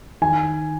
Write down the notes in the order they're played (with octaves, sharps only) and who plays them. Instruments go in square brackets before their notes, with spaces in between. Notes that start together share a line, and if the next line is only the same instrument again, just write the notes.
[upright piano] D#3 G#5